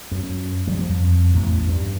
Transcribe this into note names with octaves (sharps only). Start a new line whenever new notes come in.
F#2
F3 G3
F2
A1 E2
G2